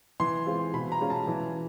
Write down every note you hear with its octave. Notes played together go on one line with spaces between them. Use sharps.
E3 C6
G#3 C4 F4
B2 B5
A#5
G#3 C#4 F4
A5
E3